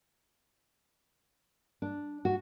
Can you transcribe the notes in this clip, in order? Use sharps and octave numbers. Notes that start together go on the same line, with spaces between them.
D4
F#4